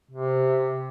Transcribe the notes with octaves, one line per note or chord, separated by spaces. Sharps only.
C3